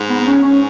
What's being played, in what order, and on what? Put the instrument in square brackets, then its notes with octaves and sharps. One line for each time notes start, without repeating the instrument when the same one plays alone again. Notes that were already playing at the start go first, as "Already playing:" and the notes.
Already playing: [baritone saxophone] G#2
[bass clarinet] B3
B3
C#4
[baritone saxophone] G#2 [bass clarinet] C#4